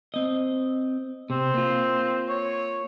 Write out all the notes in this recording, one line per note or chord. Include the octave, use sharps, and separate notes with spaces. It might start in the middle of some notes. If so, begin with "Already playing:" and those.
C4 D#5
C3 C4
A#3 F4
C#5